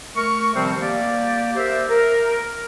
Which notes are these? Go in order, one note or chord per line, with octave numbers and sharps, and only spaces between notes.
A3 A#4 C#6
C3 D#3 F3 G3 C4
A#3 G4 D5
G4 A#4 C5 E5
A#4